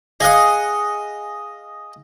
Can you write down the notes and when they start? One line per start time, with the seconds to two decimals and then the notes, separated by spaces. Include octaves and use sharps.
0.20 G#4 D#5 F5 F#5 D#6